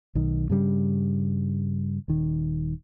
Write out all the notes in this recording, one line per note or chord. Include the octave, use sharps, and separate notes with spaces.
B1 D#3
G2 C#3 G3
D#1 D#3